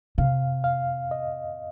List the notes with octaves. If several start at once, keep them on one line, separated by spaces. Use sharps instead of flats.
C3 F5
F5
D#5